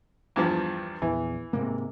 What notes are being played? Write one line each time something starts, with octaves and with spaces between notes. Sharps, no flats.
E2 G2 F3
A#1 E2 E3
G#2 C3 A#3